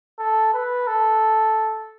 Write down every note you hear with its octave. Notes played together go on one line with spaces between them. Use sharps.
A4
B4
A4